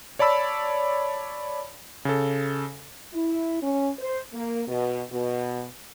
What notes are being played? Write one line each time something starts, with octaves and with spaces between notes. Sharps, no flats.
C#5 D5 A5 B5 E6
C#3 A4
E4
C#4
C5
A#3
B2
B2